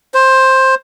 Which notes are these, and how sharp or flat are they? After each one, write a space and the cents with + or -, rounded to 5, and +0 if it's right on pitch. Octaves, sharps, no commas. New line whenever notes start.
C5 +10